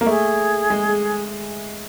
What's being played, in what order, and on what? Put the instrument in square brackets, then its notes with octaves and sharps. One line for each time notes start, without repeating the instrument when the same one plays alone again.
[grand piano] A#3
[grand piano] A3 [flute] G#4
[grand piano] G#3